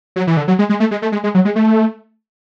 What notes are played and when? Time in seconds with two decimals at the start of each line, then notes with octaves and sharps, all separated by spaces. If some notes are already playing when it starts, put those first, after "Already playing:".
0.16 F#3
0.27 E3
0.37 D3
0.48 F#3
0.59 G#3
0.69 G#3
0.80 A3
0.91 G#3
1.02 A3
1.12 G#3
1.24 G#3
1.35 F#3
1.45 G#3
1.56 A3